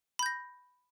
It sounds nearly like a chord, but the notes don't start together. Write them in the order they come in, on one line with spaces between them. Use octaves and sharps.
B5 G6 A#6